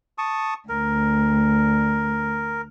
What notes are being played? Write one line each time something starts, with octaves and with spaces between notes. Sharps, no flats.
A5 C#6 D#6
D2 A#4